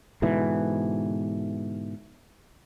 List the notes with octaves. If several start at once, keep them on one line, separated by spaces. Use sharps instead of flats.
G#2 B2 D3 E3